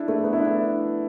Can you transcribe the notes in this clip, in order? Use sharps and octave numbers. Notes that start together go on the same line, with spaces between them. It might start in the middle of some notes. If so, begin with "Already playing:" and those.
Already playing: D4 E4
A3
B3
E4
D4